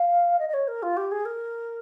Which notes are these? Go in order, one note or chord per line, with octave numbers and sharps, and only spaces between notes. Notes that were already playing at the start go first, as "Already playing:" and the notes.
Already playing: F5
D#5
D#5
C#5
A#4
F4
G4
G#4
A#4